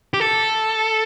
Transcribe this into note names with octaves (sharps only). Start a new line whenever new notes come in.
G4
A4